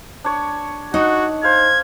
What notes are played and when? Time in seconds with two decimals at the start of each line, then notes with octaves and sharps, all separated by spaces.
0.24 D4 C#5
0.94 D#4 F#4 F#5
1.43 C5 F5 G#6